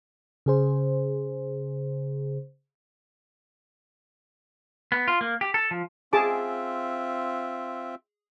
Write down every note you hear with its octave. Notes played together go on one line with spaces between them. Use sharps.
C#3 G#4 C5
B3
F4
A#3
G4
A4
F3
C4 F4 G#4 E5 A5 D6